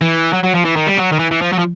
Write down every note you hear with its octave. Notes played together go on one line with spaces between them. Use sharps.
E3
F#3
F#3
F3
E3
D#3
G3
F#3
D#3
E3
E3
F3
F#3
F3